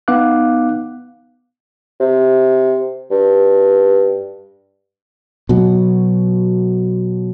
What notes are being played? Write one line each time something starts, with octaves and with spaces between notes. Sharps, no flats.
B3 D#4 F5 D6 F#6
C3
G2
B2 F#3